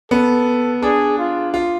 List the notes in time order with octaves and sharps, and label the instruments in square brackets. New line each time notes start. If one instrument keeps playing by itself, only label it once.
[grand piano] B3 [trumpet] A4
[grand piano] D4 [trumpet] G#4
[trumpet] F4
[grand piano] F4